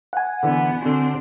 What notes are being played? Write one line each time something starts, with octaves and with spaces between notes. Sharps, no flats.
F#5 G#5
D3 E3 B3
D3 C4 D4 F#4